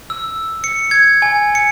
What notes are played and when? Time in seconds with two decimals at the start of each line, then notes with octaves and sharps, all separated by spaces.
0.10 E6
0.64 C#7
0.91 G#6
1.22 G#5
1.55 C#7